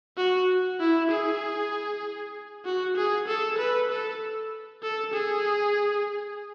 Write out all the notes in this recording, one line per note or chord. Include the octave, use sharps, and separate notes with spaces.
F#4
E4
G#4
F#4
G#4
A4
B4
A4
A4
G#4